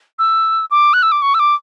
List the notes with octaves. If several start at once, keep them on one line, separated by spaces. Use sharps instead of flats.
E6
D6
F#6
E6
D6
C#6
E6
D6